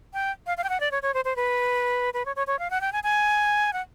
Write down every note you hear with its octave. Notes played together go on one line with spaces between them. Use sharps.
G5
F5
F5
G5
F#5
D5
C#5
C#5
C5
C5
B4
B4
C#5
C#5
C#5
F5
F#5
G5
G#5
G#5
F#5